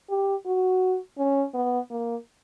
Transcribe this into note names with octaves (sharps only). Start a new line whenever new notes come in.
G4
F#4
C#4
B3
A#3